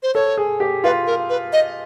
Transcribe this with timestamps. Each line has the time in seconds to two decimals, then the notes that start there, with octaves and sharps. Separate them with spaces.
0.03 C5
0.15 A4 C#5
0.37 G#4
0.60 G4
0.84 F4 B4
1.07 A#4
1.30 B4
1.53 D#5